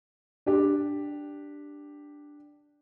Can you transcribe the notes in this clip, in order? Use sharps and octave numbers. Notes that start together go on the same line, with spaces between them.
D4 G4